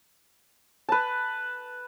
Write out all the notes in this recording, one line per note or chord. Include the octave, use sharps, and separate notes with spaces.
B4 A5